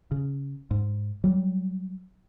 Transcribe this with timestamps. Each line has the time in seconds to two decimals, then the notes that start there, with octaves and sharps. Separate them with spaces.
0.11 C#3
0.71 G#2
1.24 F#3 G3